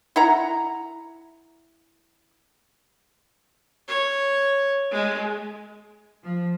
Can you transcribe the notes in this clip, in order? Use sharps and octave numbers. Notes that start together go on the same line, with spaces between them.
E4 F#5 A#5
C#5
G#3
F3